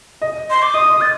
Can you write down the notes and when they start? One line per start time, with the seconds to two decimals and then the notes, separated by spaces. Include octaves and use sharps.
0.22 D#5
0.50 C6
0.62 D6
0.74 D#5 D#6
0.92 D#5
1.01 A6